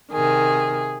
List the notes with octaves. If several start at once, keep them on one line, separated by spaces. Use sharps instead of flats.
C3 D#3 G#4